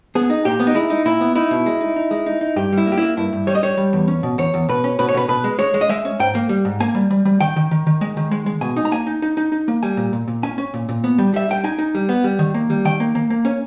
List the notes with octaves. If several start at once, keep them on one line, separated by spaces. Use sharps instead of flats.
B3 G#4
D#4
A#2 G4
B3
D#4
G#3 E4
D#4
A#2 E4
B3
D#4 E4
B2
G#3
D#4
D#4
G#3
D#4
D#4
G2 G4
G3
E4
A#3
G4
A#3 E4
G2 E4
G2
G3 C#5
D#5
G3 C#5
G3
E2
C#4
B2
E2 C#5
E2
B2 B4
C#4
B2 B4
C#5
B2 B4
B2 B4
G#3
G#3 C#5
G#3
D#5
G#3 E5
C#4
G#2 G5
A#3
G3
G#2
A#3 G#5
G3
G3
G3
D#3 G5
D#3
D#3
D#3
G#3
D#3
G#3
G#3
B2 G#5
D#4
A#5
A#3 G#5
D#4
D#4
D#4
D#4
A#3
G3 G#5
A#2
A#2
A#2
C#4 G#5
C#4
A#2
A#2
B3
G3
G3 E5
G3 G5
D#4 G#5
D#4
G3
B3
G3
D#3
A#3
G3
D#3 G5
A#3
A#3
A#3
C#4